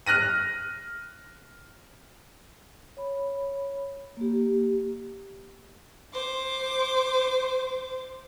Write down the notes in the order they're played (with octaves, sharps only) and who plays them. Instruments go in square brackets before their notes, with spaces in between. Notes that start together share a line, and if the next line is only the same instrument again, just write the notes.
[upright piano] F6 F#6 A#6 D#7
[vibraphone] C#5 B5
A#3 G4
[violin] C5 D6